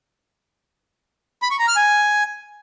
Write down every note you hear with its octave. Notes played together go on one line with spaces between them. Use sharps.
B5
C#6
A#5
F6
G#5